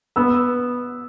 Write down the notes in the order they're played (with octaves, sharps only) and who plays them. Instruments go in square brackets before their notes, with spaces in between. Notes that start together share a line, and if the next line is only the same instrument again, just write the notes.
[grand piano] B3 [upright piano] E6